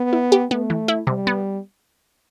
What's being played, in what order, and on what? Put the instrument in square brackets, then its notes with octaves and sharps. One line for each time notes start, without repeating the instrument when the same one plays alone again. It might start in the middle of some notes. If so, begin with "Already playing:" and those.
Already playing: [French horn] B3
[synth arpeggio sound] E4
G4
[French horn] A3 [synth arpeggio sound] B3
[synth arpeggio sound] E3
E4
[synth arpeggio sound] C3 [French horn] G3
[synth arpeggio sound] B3